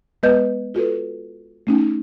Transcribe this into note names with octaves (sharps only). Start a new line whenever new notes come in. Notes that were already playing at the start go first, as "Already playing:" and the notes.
G#3 B3 B4 D#5 G6
F4 F#4 A4 B4
A3 C#4 D#4